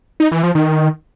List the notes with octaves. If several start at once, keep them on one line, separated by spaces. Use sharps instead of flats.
D#4
E3
F3
D#3